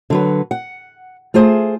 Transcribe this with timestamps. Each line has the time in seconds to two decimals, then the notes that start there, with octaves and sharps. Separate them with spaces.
0.10 D3 F#3 B4
0.51 F#5
1.34 A3 F4 G#4 C5